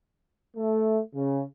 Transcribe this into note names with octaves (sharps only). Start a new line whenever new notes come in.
A3
C#3